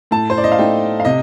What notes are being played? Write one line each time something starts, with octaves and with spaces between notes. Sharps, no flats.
A2 A5
C5
D5
D#5
F5
A3 D#4 G5
F5
C3 D#5